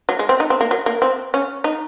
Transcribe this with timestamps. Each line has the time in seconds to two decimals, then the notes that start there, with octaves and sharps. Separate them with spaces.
0.09 F#3
0.19 G#3
0.29 C4
0.40 D#4
0.50 C4
0.61 A#3
0.71 F#3
0.86 A#3
1.02 C4
1.34 C#4
1.64 D#4